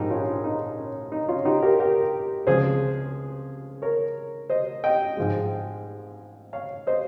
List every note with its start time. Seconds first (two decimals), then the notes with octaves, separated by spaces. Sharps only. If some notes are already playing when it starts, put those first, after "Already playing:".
Already playing: A#1 G#2 F3 G#3 D#4 G4
0.10 C#4 F4
0.44 D#4
0.77 C#4
1.12 D#4
1.28 C#4 F4
1.45 D#4 G4
1.62 G4 A#4
1.80 G4 A#4
2.47 C#2 C3 F3 G#3 G#4 C5
3.82 A#4 C#5
4.50 C5 D#5
4.84 D#5 G5
5.17 G#2 F3 G#3
6.53 C#5 F5
6.87 C5 D#5